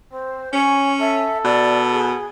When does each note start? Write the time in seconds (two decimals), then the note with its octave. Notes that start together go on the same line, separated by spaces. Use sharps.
0.13 C4 C5
0.53 C#4 C#5 G#5
1.00 A4 E5
1.45 B2 D5
1.92 G#4